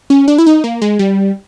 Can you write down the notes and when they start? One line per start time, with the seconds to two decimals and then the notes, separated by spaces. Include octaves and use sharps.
0.10 C#4
0.28 D4
0.38 E4
0.47 D#4
0.64 A#3
0.82 G#3
0.99 G3